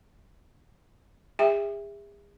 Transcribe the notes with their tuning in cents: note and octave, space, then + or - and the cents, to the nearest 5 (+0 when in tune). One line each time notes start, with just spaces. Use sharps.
G#4 -40 E5 +0 G5 +35